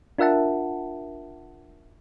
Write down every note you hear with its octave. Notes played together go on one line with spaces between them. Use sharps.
D4 F4 A#4 E5 F#5 A5